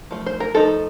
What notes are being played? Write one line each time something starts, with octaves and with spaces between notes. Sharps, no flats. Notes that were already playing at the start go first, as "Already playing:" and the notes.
F3 A3
C5
A#4
F3 A3 D#4 A4